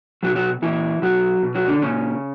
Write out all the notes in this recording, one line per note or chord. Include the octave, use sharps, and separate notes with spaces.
B2 F#3 F#4
F#3 F#4
A#2 E3 E4
B2 F#3 F#4
B2
F#3 F#4
D3 D4
A#2 C#3 C#4